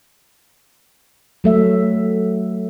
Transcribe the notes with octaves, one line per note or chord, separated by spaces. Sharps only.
F#3 A3 E5